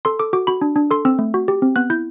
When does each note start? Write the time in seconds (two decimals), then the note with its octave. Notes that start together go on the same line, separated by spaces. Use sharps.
0.05 A4 C6
0.19 A4 D6
0.33 F#4 D6
0.47 F#4 B5
0.61 D4
0.76 D4
0.91 A4 C6
1.05 C4 E6
1.19 A3
1.34 F#4
1.48 G4
1.62 C4
1.76 B3 F#6
1.90 E4 G6